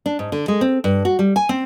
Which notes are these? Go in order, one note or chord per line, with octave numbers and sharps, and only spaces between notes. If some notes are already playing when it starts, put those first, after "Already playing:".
D4
G#2
D3
G#3
C4
G2
F#4
G3
G#5
C4